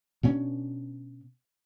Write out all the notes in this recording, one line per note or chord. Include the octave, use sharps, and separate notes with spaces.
B2 B3 C#4 D4